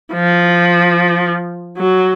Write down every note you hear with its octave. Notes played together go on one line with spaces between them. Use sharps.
F3
F#3